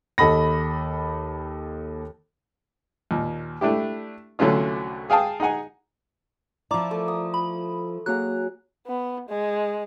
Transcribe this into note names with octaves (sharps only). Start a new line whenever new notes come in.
D#2 A4 D#5 B5 A#6
D#2 A#2
A3 D4 E4 G4
C2 D3 F#3 A3 C#4 F4
G#4 F5 G5 A5 D#6
D#4 G#4 F#5 G#5
F3 E4 D5 A#5 D6
A3 A#4
D#6
B5
F#3 A#3 G#4 A#5 F#6
B3
G#3